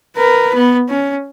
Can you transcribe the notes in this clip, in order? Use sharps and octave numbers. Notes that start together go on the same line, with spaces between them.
A#4 B4
B3
C#4